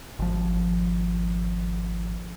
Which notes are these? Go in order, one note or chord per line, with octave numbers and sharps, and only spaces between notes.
G#1 F3